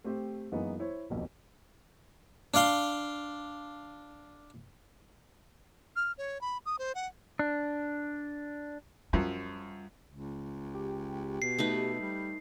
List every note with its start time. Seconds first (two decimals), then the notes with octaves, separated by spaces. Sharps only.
0.04 A3 C4 G4 C5
0.52 F#2 E3 G#3 A#3 B3 D#4
0.80 E4 C5 C#5
1.10 D#1 B1 F2
2.54 D4 D5 F5 C6
5.96 F6
6.18 C#5
6.41 B5
6.66 D#6
6.79 C5
6.95 F#5
7.39 D4
9.13 F#2 F3 G3
10.10 C#2
10.74 G4
11.42 B2 C7
11.58 A3 D#4 B4
12.01 G3